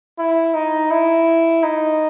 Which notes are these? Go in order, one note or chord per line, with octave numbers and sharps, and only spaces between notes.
E4
D#4
E4
D#4